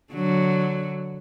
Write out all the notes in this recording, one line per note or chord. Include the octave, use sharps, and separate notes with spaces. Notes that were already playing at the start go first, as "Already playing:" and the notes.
D3 F#3